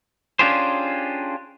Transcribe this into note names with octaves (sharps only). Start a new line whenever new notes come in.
C#4 D4 F4 G4 G#4 C5